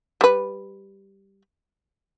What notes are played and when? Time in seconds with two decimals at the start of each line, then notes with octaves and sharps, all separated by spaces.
0.21 G3 B4